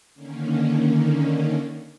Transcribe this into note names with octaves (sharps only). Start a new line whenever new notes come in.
D3 D#3 A#3 C#4